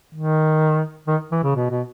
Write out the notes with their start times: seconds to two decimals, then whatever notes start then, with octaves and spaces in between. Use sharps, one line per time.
0.15 D#3
1.08 D#3
1.32 E3
1.44 C#3
1.55 B2
1.71 B2